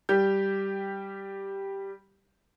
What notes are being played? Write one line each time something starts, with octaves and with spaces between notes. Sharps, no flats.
G3 G4 G6